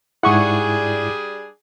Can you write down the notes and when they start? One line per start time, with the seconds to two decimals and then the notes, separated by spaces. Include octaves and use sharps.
0.23 G#2 G3 D4 E4 G#4 F#5 C#6